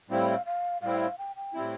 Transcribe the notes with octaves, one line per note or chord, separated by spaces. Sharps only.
A2 G3 C4 E4 F5
F5
A2 G3 C4 E4 F5
F5
G5
G5
A2 G3 C4 E4